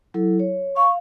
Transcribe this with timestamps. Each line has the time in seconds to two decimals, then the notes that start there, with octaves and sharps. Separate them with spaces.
0.14 F#3 E4 A4
0.39 C#5
0.77 F5 C#6